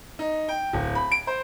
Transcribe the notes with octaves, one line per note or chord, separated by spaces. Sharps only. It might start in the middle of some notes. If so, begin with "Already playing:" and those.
D#4
G5
D1
B5
D7
C5